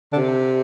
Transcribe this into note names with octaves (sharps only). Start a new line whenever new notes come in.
D3
C3